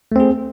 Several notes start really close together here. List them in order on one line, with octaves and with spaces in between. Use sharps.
A3 C4 G#4